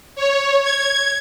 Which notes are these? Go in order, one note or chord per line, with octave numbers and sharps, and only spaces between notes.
C#5
G#6